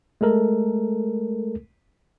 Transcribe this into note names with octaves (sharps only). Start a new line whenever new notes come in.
G#3 A3 A4 A#4